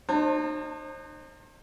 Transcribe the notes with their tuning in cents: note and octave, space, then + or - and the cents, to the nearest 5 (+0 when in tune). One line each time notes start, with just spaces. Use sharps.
D#4 -35 C5 +35 A5 +25